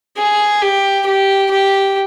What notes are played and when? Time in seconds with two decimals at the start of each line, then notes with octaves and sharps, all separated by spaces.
0.17 G#4
0.62 G4
1.06 G4
1.51 G4